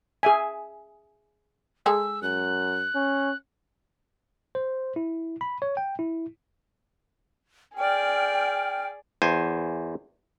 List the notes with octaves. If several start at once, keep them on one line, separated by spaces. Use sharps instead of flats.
G#4 E5 G#5
G#3 G#4 A4 E6
F#2 F#6
C#4
C5
E4
B5
C#5
G5
E4
G#4 D5 G5 F6
E2 C5 G#5